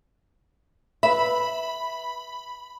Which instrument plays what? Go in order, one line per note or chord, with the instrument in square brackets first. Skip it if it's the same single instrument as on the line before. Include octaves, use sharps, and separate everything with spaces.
[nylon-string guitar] B4 E5 [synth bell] B5